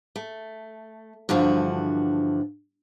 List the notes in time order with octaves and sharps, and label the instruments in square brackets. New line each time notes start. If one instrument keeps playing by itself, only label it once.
[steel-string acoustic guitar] A3
G2 D3 E3 F3 F#4